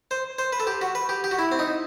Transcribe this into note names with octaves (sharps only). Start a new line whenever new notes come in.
C5
C5
B4
A4
G4
F#4
B4
G4
G4
F#4
E4
C4
D#4